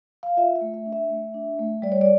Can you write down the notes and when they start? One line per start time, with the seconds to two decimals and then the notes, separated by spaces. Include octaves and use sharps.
0.23 F5
0.37 F4 E5
0.56 E5
0.61 A3
0.74 E5
0.86 D4
0.93 E5
1.10 A3
1.34 D4
1.59 A3
1.82 G3 D5
1.92 C#5
2.01 D5